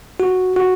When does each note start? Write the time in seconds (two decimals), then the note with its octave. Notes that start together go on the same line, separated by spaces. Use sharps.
0.20 F#4
0.56 F#4